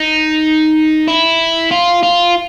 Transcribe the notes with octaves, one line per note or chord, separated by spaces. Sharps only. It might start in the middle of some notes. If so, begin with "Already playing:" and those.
Already playing: D#4
E4
F4
F4